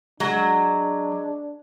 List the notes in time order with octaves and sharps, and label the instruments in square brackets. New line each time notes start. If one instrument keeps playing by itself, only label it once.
[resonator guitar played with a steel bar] F#3 [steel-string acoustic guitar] G#3 [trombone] D4 [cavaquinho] F#5 A#5